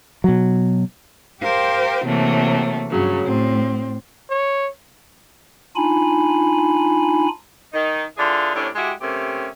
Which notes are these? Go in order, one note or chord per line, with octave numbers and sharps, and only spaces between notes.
B2 F#3
G4 A#4 C5 F5 G5
C3 E3 F#3 A3 A#3
G2 C#3 F#3
A2 C4
C#5
D4 D#4 F4 G#5 B5
D#3 D#4
D3 E3 D4 F4 G#4
A2 C3 C#4 D4
G#3 E4 F#4 G4
C3 A3 A#3 C#4 G4